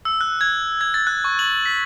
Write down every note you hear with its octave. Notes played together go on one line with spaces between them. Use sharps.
E6
F#6
G#6
G#6
A6
F#6
C#6
F#7
B6